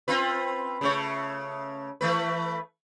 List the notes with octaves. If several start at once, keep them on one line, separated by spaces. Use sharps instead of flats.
C4 F4 B4
C#3 A3 C#5
E3 A3 B4